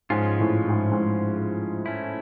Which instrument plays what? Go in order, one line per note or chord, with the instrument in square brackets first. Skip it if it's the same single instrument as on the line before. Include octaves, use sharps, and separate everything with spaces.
[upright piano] G#2 [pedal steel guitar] F3 G#3 C#4 F4
[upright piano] A2
G#2
G#2
A2
[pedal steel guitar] A3 C#4 E4